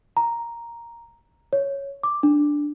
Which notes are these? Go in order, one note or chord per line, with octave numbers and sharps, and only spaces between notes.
A#5
C#5
D6
D4